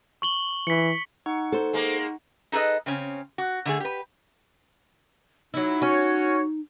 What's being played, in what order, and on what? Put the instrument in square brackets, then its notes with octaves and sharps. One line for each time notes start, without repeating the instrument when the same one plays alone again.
[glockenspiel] C#6 F#7 G7
[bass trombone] E3 [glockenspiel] B6 C#7
[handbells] D#4 F#5 C#6
[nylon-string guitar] A4 C5
[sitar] G#3 A#3
[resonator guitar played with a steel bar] D#4 G#4 A4 B4 D#5
C#3 C4 C#4
F#4
D3 A3 G#4
G4 B4
[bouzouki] F#3 E4 [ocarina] D#4
[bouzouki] C#4 [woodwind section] F#4 C#5